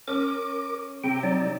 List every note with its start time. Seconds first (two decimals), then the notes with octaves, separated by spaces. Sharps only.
0.08 C#4 A#4 D6
1.04 C3 G5
1.23 F#3 D#4 D5